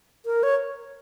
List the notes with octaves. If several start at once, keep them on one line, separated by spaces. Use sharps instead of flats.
A#4
C#5